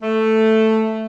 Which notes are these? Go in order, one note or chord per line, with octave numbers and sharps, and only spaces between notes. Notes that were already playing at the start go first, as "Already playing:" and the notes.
A3